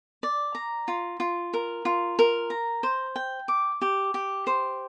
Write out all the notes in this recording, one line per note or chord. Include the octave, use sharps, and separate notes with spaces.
D5
A#5
F4
F4
A#4
F4
A#4
A#5
C5
G5
D6
G4
G4
C5